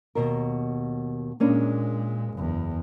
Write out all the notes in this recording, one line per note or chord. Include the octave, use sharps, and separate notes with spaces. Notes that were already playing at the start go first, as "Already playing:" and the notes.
D#2 B2 A#4
A#2 G#3 A#3 C#4 D4
F#1 E2